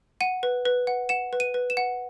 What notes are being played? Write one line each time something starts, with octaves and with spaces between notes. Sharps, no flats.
F#5 D#7
B4
B4
F#5
F#5 E7
B4
D#7
B4
E7
F#5